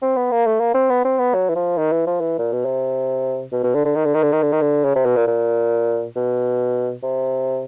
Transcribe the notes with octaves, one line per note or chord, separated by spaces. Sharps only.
C4
B3
A#3
A3
A#3
C4
B3
C4
B3
F#3
E3
F3
D#3
E3
F3
E3
A#2
B2
C3
B2
B2
D3
D3
D#3
D3
D#3
D3
D#3
D3
D#3
D3
C#3
C3
B2
A#2
A#2
B2
C3